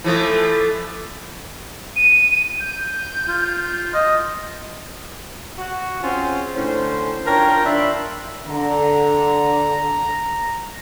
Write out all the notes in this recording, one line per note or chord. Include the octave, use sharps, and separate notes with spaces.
E3 F3 A3
D#7
G6
F4
D#5
F#4
C4 C#4 F4 F#4 G#4 C5
A2 D3 C#4 C5
D4 F4 A#4 C#5 G5
D#3 D4 E5 F5 B5 C6
D3 A#5